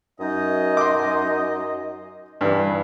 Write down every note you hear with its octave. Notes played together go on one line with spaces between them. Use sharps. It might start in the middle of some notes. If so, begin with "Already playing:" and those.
F#2 D#4 D#5
C6 D6
G2 E3